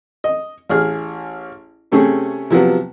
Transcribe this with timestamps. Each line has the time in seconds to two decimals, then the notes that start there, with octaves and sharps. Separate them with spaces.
0.24 D#5
0.69 A1 G#4 F6
1.92 C3 A3 C4 C#4 G#4
2.50 C3 F3 F#3 B3